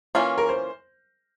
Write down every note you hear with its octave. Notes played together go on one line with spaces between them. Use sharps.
E3 A#3 C#4 F4
A#4
C5